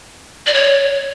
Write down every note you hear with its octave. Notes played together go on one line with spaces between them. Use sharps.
D5
C#5